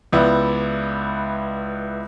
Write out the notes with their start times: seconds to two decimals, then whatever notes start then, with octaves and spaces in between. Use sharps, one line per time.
0.12 C#2 B3 E4 D5